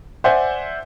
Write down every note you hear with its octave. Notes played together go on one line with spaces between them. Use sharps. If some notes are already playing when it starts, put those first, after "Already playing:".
C5 D5 E5 F#5 G#5